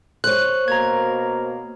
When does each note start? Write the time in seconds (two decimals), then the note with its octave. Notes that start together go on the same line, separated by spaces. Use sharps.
0.24 C5 C#5 F#6
0.68 B2 A#3 A#5 G#6